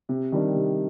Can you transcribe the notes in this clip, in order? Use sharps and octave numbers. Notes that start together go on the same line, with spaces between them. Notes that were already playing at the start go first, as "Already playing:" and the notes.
C3
D#3 G3 D4
C3